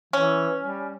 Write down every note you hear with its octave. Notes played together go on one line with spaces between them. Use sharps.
E3 C#4
G3